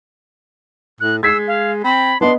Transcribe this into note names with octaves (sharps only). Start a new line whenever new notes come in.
A2 F#6
G#3 E6 G#6 B6 C7
F5
C4 B5
B3 D4 D#5 C6